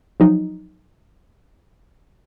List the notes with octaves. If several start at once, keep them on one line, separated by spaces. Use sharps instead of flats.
F3 F#3 D#4